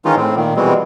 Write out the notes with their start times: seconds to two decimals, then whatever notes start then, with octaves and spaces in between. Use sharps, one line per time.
0.05 D#3 E3 G#3 C#4 D#4 F4
0.17 A2 C4
0.37 A#2 D#3
0.56 B2 E3 G3 G#3 C4